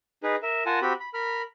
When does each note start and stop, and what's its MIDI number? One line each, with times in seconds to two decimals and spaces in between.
0.23 0.36 63
0.23 0.36 68
0.23 0.36 71
0.43 0.63 70
0.43 0.63 76
0.66 0.79 65
0.66 0.79 70
0.66 0.79 78
0.66 0.79 80
0.66 0.79 81
0.82 0.93 60
0.82 0.93 66
0.82 0.93 67
0.82 0.93 83
1.00 1.09 83
1.14 1.42 70
1.14 1.42 83
1.14 1.42 89